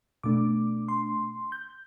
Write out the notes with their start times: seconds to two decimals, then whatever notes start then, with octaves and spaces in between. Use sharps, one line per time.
0.23 B2 A3 D4 D6
0.88 C6
1.52 G6